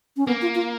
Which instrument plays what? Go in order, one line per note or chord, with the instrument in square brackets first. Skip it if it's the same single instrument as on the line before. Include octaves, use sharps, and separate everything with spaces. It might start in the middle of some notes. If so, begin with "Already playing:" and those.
[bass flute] C#4
[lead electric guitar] A#3 [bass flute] B3
[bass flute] F4
F4